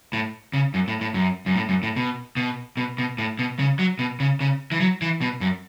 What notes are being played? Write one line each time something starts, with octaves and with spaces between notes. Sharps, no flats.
A2
C#3
F#2
A2
A2
F#2
F#2
A2
F#2
A2
B2
B2
B2
B2
A2
B2
C#3
F#3
B2
C#3
C#3
E3
F#3
E3
B2
F#2